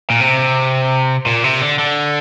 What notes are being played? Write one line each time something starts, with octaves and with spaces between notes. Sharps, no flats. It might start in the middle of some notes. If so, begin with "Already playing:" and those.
A#2
C3
A#2
C3
D3
D3